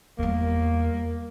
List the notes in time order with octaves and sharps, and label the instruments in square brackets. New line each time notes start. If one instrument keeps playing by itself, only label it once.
[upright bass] E2 G3 [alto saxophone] A#3